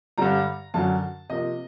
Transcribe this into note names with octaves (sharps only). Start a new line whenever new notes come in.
G2 D3 G3 A#5
F#2 D3 F#3 A5
C3 F3 A#3 D#5